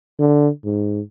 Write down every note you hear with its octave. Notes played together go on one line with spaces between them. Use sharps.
D3
G#2